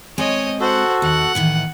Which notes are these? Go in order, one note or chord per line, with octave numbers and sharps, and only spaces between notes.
G#3 C4 C#5 D#5 G#5
F#4 A4 C5 F#5
D#2 F#5
A2 D#3 E3